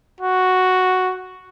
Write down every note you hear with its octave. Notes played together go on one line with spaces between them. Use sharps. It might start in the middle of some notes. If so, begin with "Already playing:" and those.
F#4